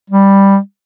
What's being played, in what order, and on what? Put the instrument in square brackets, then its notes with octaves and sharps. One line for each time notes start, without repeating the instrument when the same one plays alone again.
[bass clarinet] G3